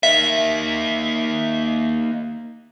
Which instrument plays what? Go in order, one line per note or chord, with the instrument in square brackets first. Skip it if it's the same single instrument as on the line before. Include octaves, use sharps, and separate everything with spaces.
[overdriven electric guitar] A#3 D#4 [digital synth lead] E5